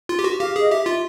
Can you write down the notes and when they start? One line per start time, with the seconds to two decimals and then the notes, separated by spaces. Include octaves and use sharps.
0.09 F4
0.19 G4
0.24 F#4
0.40 G4 F5
0.56 G#4 D#5
0.71 G4 E5
0.86 F4